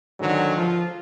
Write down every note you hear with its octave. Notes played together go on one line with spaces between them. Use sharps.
G#2 D3 D#3 F#3
F3 F4